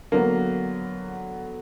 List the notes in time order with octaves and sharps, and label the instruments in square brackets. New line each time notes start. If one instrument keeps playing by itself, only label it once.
[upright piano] D3 F#3 B3 [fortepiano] A#3